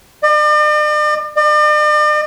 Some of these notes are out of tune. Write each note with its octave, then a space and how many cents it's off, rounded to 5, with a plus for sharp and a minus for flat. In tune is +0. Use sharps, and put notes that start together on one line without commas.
D5 +45
D5 +45